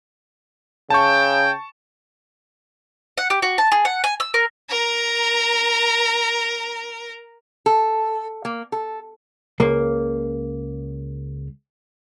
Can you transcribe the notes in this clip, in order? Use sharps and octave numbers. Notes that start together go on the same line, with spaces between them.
C#3 G5 A5 C#6
F#5
G4
F#4
A5
G#4
F#5
G#5
E6
A#4
A#4 A#5
A4
A#3
A4
C#2 A#3